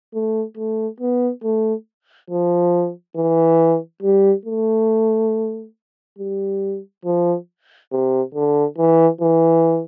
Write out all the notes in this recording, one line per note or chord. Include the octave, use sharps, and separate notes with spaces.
A3
A3
B3
A3
F3
E3
G3
A3
G3
F3
C3
D3
E3
E3